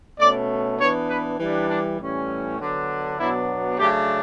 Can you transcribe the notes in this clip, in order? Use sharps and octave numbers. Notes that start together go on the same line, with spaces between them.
B2 A3 C#4 D5
E3 B3 D4 C#5
B4
E3 G3 D4
D4
A2 E3 G3 C#4
D3 F#3 B3 D4
B2 F#3 B3 D4 E4
C#3 F#3 A3 D4 G4